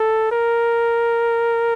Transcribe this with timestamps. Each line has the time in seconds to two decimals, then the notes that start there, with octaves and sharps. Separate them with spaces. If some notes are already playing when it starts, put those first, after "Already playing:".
Already playing: A4
0.32 A#4